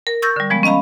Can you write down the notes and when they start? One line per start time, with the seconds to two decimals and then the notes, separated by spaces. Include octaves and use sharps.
0.07 A#4
0.22 C#6 E6 G6 A6 A#6
0.36 D3 G3
0.50 F3 G#3 B3
0.63 C#4 D#5 F5 A#5 B5